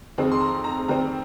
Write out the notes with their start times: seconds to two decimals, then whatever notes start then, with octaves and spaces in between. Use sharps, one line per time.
0.18 F2 D#3 G#3 C4
0.32 C6
0.41 A#5
0.64 A#5
0.88 D#3 G3 C4 A#5